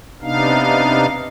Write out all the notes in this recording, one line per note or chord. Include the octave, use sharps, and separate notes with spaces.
C3 B3 D4 D#4 F5